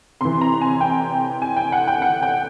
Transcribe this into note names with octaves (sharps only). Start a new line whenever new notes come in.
C3 E3 C6
A#5
G#5
G5
G#5
G5
F#5
G5
F#5
G5